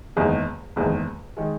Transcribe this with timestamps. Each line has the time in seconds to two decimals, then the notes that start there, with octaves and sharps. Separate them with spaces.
0.16 F#1 E2 D#3 G#3
0.76 F#1 E2 D#3 G#3
1.37 D#3 G#3